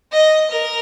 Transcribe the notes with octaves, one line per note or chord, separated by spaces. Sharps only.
D#5
A#4